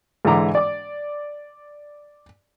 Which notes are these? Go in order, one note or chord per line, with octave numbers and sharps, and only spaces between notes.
G#2 D3 E3 A#5 D6
D5 D6